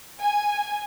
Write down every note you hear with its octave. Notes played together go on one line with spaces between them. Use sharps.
G#5